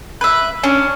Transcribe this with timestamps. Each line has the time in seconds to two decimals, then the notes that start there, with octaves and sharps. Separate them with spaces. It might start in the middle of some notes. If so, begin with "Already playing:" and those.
0.21 B4 E5
0.63 C#4 D4